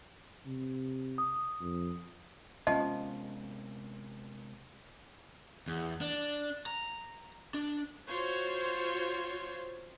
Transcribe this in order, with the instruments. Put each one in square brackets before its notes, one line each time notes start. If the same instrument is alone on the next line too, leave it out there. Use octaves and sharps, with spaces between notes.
[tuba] C3
[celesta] D#6
[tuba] F2
[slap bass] C3 G#3 B3 [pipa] F3 [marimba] C#4 [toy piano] D#5
[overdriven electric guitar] E2
D4
A#5
D4
[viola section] F4 F#4 C5 C#5